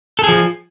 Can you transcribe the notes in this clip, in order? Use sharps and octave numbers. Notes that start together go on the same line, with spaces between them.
F3 G#4 A4